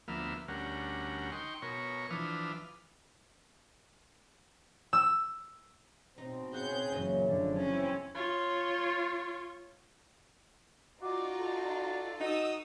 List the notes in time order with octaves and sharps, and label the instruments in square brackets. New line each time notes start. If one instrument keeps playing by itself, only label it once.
[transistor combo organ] D2 F3 A#3 B3 E5 F6
D2 G3 C#4 A#4 F#5
D#4 G5 C6 C#6
B2 A#4 C#5 C#6
E3 F3 D4 B4 D#6 F6
[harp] E6
[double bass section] B2 C4 [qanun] D#4
[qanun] C#3 F#5 C#6 [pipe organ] G#4 G6
[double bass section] F#1 F#2 [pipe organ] A#2 [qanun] E3 C#4 D#5
[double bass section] F1 F#2 [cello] D3 [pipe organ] F3
[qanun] G#3 [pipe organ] C4 E4 [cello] C#4
[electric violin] F4 C#5
[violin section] D#4 F4 D5 [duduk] F#4 [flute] D6
[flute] A4
[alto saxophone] D#4 [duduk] F#4 [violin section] D#6 E6